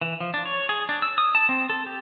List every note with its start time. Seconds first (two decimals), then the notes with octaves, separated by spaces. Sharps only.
0.01 E3
0.20 F3
0.34 D4
0.45 C#5
0.69 G#4
0.89 D4
1.02 E6
1.18 D#6
1.35 A5
1.49 C4
1.70 A4
1.86 G4